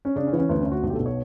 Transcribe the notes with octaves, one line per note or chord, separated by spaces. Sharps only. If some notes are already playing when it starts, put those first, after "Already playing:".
C#4
C#3 D4
C#4
E3 B3
C#4
D2 B3
C#4
D2
F#4
B1
G4
A4
B2
C#5